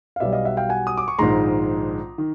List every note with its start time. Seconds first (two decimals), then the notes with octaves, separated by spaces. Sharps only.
0.16 F5
0.20 B1 B2 G3 D5 E5
0.32 D#5 F5
0.45 E5 F#5
0.57 F5 G5
0.69 F#5 G#5
0.87 D#6
0.97 D6
1.08 C#6
1.19 A#1 G#2 D#3 G#3 A#5 C6
2.18 D#3